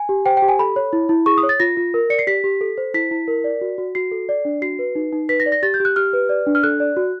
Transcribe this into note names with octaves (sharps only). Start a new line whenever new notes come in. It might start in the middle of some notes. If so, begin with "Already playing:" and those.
Already playing: G#5
G4
C5 G5
G5
G4
G#5
A4 B5
C#5
E4
E4
G#4 C#6
D#6
C#5
A6
F4 A#6
F4
A#4
D5 C#7
C7
G4 B6
G4
A4
C5
E4 B6
E4
A#4
D5
F#4
F#4
F#4 C7
A4
D5
D4
F#4 C7
B4
D#4
D#4
B4 B6
A#6
D5
A#6
G4 A6
G6
G4
F#6
G4 F6
B4
D5
D4
F6
A4 F#6
D5
F#4